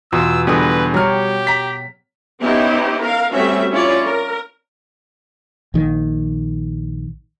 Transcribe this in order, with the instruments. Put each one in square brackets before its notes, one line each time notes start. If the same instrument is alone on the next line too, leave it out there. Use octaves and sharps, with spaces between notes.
[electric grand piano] E2 C6 [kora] B2 F4 [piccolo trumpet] E6
[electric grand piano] E2 D3 [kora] G3 G#4 D#5 [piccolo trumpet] B4
[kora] F#3 C#5 [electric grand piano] G3 F6 [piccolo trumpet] G4
[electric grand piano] A#5 B6
[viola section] B3 C#4 D#4 E4 G4 C5
A#4 F5
G3 A3 C4 C#4 F#4 E5
C#4 E4 F4 C#5 D5
A#4
[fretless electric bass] A#1 D#3